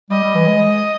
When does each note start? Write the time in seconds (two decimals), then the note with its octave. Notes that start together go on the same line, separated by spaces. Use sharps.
0.10 G3 D#5
0.23 G3
0.35 E3
0.48 G#3